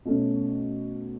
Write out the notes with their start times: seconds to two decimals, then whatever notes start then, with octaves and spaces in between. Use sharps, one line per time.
0.05 B2 A3 C#4